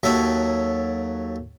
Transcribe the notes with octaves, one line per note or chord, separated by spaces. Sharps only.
D#2 F#3 A4 E5